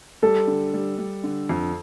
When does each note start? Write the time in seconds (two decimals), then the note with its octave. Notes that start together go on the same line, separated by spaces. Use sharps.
0.22 G3 A4
0.47 D3
0.73 G3
0.99 G3
1.24 D3
1.49 F2